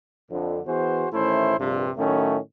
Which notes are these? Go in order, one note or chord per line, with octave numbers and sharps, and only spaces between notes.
F2 D3
E3 B3 F#4 G#4 C5
A1 D#3 A3 C#4 E4 C5
A#1 G2 C3
A2 D#3 F#3 A3 C#4